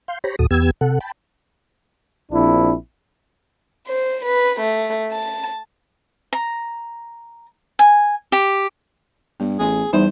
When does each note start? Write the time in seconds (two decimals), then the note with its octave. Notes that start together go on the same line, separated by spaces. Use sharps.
0.08 F5 C6 G6
0.24 G4 C5 C#5 A#5 B5
0.39 D#2 A#2 F#4 A4 D#6
0.51 E2 B3 G4 E6 G#6
0.81 C3 A4 F#5
1.00 G5 A5 B5
2.32 A#1 C4 D4 E4
3.87 C5
4.23 B4
4.59 A3
5.10 A5
6.33 A#5
7.79 G#5
8.32 G4
9.40 G2 B3
9.59 A1 G#4
9.93 E2 G3 D#4 C5